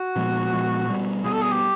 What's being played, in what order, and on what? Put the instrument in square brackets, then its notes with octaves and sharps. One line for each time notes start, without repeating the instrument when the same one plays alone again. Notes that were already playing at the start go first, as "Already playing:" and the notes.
Already playing: [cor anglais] F#4
[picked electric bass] A#2 F3 G#3 B3
A#2 F3 G#3 B3
B2 G3 B3
[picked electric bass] B2 G3 B3 [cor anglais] G#4
[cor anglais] A4
G#4
G4